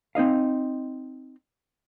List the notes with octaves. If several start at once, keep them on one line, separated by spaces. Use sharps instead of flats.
C4 D#4 D#5 F5